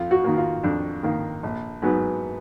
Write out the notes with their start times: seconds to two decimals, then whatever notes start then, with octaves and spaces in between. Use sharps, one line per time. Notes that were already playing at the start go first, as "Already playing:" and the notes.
Already playing: F2 F4
0.11 F#4
0.24 D#3 A#3
0.38 F4
0.63 F2 D4
1.03 D#3 A#3
1.43 A#1
1.82 G#2 F#3 B3